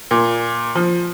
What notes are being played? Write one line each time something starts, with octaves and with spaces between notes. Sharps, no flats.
A#2
F3